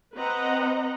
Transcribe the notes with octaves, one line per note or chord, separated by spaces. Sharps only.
C4 B4 D#5 F#5 A#5